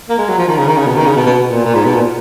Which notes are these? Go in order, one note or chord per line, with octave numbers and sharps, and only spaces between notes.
A#3
G#3
F#3
F3
D#3
C#3
D#3
C#3
B2
D#3
C#3
B2
B2
B2
A#2
A#2
G#2
B2
A#2